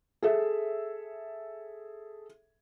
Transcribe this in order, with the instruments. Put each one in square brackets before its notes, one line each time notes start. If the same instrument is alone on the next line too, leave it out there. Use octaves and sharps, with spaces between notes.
[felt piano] G#4 A4 E5